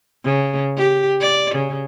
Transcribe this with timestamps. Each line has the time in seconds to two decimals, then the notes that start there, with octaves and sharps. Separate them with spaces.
0.24 C#3
0.77 G4
1.21 D5
1.55 C#3